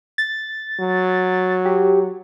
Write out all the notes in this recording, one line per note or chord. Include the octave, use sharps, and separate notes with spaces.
A6
F#3
G4